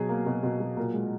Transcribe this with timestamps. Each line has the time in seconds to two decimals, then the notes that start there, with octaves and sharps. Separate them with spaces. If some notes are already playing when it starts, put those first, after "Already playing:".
Already playing: B2 F#3 G#4
0.09 A#3
0.26 B2
0.43 B2
0.60 F#3
0.77 A#2 A#4
0.94 G#3